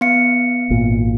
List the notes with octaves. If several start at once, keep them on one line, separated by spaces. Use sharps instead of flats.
B3 F5 C#7
G#1 A#2